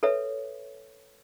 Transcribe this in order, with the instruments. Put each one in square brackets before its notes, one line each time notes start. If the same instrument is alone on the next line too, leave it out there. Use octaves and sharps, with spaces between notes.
[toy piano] A4 B4 C#5 E5